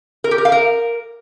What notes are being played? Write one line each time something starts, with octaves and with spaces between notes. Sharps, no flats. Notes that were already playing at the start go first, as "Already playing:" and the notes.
A#4
G4
A#4
F5
A#4